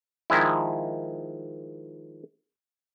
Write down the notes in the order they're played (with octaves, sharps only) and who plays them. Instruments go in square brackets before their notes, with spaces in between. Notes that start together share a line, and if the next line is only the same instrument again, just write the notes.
[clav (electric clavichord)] D#3 F3 G#3 E4